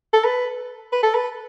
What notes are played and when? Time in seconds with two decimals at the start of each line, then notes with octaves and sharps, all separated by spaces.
0.13 A4
0.25 B4
0.92 B4
1.03 A4
1.15 B4